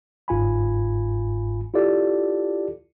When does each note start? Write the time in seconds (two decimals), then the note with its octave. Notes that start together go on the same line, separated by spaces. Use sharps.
0.28 G1 G#2 F4 G#5 B5
1.74 E4 F4 G4 A4 D5